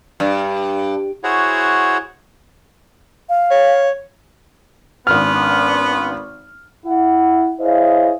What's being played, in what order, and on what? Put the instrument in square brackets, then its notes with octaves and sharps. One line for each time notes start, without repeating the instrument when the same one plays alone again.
[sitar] G2
[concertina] E4 F#4 G#4 C5 C#5 F#5
[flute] F5
[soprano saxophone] C#5
[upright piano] G#1 F6 [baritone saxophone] B3 [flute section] C#4 D4 C6
[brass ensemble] E4 F#5
E4 G#4 C5 C#5 D#5 F5